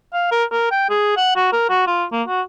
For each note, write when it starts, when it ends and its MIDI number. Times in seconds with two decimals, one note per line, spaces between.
0.14 0.31 77
0.31 0.44 70
0.52 0.70 70
0.72 0.87 79
0.90 1.12 68
1.17 1.32 78
1.36 1.49 66
1.53 1.69 70
1.70 1.87 66
1.87 2.05 65
2.12 2.23 58
2.28 2.42 66